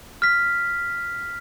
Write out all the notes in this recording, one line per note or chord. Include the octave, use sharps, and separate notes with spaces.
F6 B6